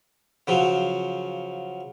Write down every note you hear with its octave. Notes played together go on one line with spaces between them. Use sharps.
C#3 F3 F#3